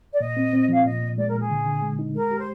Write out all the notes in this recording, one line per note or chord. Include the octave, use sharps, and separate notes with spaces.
D5
A#2 D#5
C4
C4
F3 F5
A#2 D#5
A#2
G#3 D5
A#4
A#2
G#4
D3
D3
G#3
D#4
G#3 A#4
G4
C5